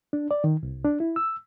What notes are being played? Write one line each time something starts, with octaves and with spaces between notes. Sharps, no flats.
D4
D5
D#3
C2
D4
E4
E6